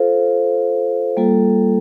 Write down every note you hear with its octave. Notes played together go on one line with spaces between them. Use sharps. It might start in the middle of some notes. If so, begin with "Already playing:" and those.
Already playing: F4 A4 C5 F5
G3 A#3 F4 A4